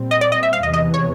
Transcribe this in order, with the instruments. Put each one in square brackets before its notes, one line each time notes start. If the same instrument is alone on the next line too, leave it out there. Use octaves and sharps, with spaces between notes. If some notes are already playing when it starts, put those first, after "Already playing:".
Already playing: [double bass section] A#2 G3 C4
[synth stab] D#5
D5
D#5
E5
F5
[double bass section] E2 C3 E3 G#3 [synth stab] D#5
[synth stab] D#5
C#5